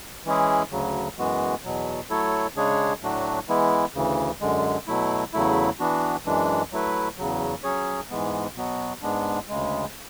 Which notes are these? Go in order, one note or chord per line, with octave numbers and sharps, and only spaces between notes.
E3 G#3 C#4 E4 G#4
D2 C#3 F#3
F#2 E3 G#3 B3 F#4
E2 B2 F#3
F#3 A3 E4 A4 C#5
C#3 G#3 D4 G#4 C#5
A2 F#3 A3 D4 F#4
E3 G#3 B3 E4
D2 C#3 E3
F#2 D3 G#3
B2 F#3 A3 E4
E2 C#3 F#3 A3 E4
E3 B3 D4 F#4
F#2 E3 G#3 D4
F#3 A3 E4 B4
E2 C#3 F#3
F#3 C#4 G#4 C#5
G#2 E3 G#3 B3
B2 F#3 B3 F#4
G#2 G#3 B3 D4
D2 C#3 G#3